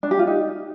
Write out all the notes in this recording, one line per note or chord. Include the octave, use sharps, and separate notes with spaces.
D4
G4
F4
D#4